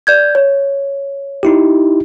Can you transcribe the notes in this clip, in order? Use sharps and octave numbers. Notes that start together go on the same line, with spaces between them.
D5 G6 G#6
C#5
D#4 E4 G4